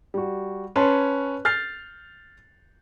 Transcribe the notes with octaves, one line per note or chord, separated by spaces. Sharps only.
G3 F#4
C#4 B4 C#5 A5 C6
F6 G6 A6 C7